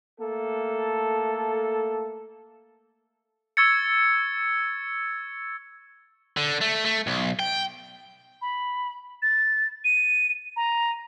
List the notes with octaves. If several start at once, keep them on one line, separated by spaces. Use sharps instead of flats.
A3 A#3 A4
C#6 E6 G#6 A6 C#7
D3
A3
A3
B1
G5
B5
A6
D#7
A#5